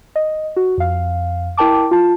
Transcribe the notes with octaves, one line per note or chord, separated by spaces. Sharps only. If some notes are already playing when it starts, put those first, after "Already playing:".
D#5
F#4
F2 F5
E4 A#4 G5 A5 D6
F4 A5